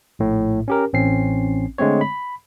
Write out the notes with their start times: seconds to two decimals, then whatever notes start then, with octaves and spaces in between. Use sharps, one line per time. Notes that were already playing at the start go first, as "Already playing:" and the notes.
0.19 A#1 A2
0.68 C#4 G4 A#4
0.93 A1 C4 C#4 C7
1.78 D3 G#3 A3 C4 C#5
2.01 B5